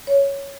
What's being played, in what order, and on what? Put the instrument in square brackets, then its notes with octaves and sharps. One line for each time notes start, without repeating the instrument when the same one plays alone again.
[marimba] C#5